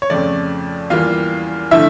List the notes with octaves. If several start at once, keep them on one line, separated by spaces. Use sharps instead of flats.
C#5
F2 C#3 F3 A3 D5
E2 E3 G3 A#3 F4 F5
D3 F3 A3 E4 E5